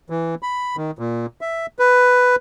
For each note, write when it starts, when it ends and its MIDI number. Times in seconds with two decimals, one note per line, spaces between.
0.10 0.35 52
0.43 0.76 83
0.77 0.91 51
0.99 1.26 46
1.41 1.66 76
1.79 2.36 71